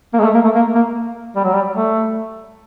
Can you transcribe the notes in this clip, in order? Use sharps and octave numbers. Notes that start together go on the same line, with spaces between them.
A#3
G#3
A3
A#3
A3
A#3
A#3
G3
F#3
G3
A3